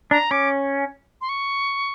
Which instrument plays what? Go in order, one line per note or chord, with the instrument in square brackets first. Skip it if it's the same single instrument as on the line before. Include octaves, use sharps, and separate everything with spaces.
[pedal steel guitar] D4 [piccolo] A#5
[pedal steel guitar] C#4 [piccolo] D6
[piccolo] C6
C#6